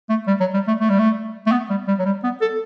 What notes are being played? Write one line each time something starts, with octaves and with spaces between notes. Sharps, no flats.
A3
G3
F#3
G3
A3
A3
G3
A3
A3
B3
G3
G3
F#3
G3
B3
A4